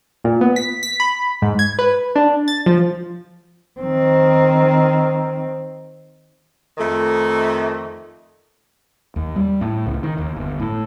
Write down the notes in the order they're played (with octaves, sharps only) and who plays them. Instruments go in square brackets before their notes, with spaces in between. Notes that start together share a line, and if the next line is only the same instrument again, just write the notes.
[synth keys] A#2
B3
B6
B6
B5
G#2
G#6
B4
D4
A6
F3
[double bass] D#3 C4
[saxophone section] F2 D#3 A3
[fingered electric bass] D#2
G3
A2
C#2
D#3
D#2
G1
A2